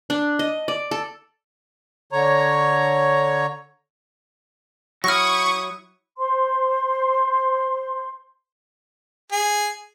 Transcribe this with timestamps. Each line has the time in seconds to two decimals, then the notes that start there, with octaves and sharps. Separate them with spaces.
0.10 D4
0.39 D#5
0.68 D5
0.91 A4
2.12 D3 C#5 A#5
5.04 F#3 E4 C#6 D#6 F6 A#6
6.18 C5 C6
9.32 G#4